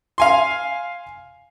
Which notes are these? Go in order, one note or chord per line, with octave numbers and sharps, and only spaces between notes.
F5 G#5 C6